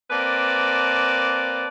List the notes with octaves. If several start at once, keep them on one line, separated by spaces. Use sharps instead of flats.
A#3 C4 B4 D5 A5